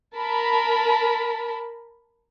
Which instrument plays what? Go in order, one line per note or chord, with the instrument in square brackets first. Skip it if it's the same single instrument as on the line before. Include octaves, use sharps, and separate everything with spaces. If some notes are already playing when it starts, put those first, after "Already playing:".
[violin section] A#4 A5 B5